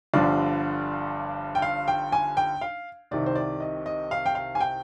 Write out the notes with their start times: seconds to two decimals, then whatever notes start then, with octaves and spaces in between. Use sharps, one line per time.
0.13 G1 G2 D3 F3 D5
1.55 G5
1.62 F5
1.88 G5
2.12 G#5
2.37 G5
2.61 F5
3.11 C2 C3 D#3 D5
3.26 C5
3.35 D5
3.60 D#5
3.86 D#5
4.11 F5
4.26 G5
4.35 F5
4.55 G#5
4.60 G5